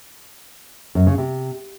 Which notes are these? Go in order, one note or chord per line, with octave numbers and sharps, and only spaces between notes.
F#2
C#3
C3